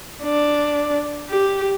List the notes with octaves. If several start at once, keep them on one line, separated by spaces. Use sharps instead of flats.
D4
G4